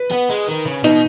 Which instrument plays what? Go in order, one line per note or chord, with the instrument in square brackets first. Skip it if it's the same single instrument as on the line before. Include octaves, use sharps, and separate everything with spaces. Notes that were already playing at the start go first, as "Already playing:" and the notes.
Already playing: [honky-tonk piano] B4
[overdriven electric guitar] B3
G#3
D#3
C#3
[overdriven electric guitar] B2 [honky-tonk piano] D#4